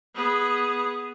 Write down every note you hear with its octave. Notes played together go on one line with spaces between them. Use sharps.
B3 G#4